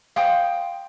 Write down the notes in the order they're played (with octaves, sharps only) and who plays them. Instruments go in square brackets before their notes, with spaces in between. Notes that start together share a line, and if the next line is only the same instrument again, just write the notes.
[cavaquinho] C5 G5 D#6 [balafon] F5